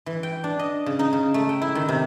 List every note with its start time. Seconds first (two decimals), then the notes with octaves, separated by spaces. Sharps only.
0.06 E3
0.23 G5
0.44 D4
0.59 D#5
0.86 C#3
0.99 D#4
1.13 C#3
1.34 A3
1.49 G5
1.62 E4
1.75 D#3
1.89 C3